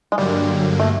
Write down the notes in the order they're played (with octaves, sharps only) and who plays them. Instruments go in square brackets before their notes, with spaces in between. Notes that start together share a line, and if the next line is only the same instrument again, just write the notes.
[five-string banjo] G#3
[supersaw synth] G2 D3 F#3 A#3 [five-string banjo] G3
[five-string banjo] A3